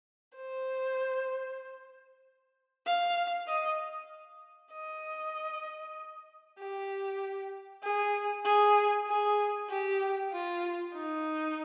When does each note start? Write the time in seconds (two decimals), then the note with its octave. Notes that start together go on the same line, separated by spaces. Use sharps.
0.37 C5
2.86 F5
3.48 D#5
4.72 D#5
6.59 G4
7.83 G#4
8.45 G#4
9.08 G#4
9.69 G4
10.32 F4
10.94 D#4